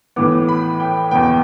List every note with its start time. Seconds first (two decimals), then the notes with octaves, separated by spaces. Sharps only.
0.16 A2 E3 B3 D6
0.48 B5
0.80 G5
1.11 E2 B2 B3 G5